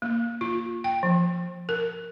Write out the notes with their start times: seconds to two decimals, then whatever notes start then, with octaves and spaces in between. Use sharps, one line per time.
0.02 A#3
0.41 F4
0.84 G5
1.03 F3
1.69 A#4